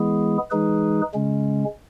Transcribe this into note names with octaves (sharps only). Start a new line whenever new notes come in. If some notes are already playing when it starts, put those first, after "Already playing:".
Already playing: E3 G#3 B3 E4 G#4
E3 G#3 D#4 G#4 B4
C#3 G#3 C#4